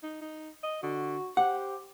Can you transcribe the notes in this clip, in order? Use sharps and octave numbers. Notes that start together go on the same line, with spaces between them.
D#4
D#4
D#5
D3 F#4
G4 C5 F#5